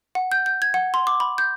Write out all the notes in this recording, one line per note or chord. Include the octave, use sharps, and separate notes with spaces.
F#5
G6
G6
G#6
F#5
C6
D6
B5
G6